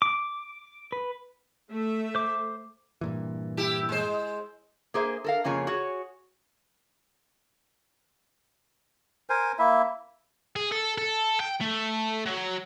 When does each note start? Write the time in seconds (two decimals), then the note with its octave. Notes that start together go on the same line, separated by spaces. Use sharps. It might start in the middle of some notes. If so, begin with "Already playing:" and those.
0.02 D6
0.92 B4
1.71 A3 E5
2.15 C5 D6
3.01 G2 A#2 E3
3.57 E4 G4
3.89 G#3 C5
4.94 A#3 G#4 C5 E5
5.24 A4 A#4 F5
5.44 F2 C#3 A#3 F4 C#5 G#5
5.67 F#4 G#4 C#5
9.30 A#4 C5 G#5
9.59 A#3 E4 E5
10.56 G#4
10.72 A4
10.98 A4
11.40 G5
11.61 A3
12.26 F#3